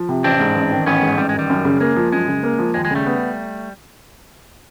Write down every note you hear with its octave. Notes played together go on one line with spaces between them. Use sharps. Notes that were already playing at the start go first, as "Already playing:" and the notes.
Already playing: F3
C3
A1 C4 D4
G#2
A1
D#3
A1 B3 C#4
G#2
A1 G3
G#3
D#3 G3
F#2
C#3
G#3 A#3
F3
F#2 G#3
C#3
A#3
F3
D#2 G#3
G#3
C#3 G3 A3
B3